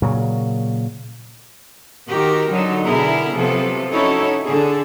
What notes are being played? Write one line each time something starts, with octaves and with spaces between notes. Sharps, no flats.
A#2 C#3 F#3
D#3 F#4 G4 A#4
D3 F#3 D#4
B2 D3 B3 E4 G#4 A#4
C3 F3 F#3 B3 A4
C#4 D#4 E4 F#4 A4 C#5
D3 G#4 A4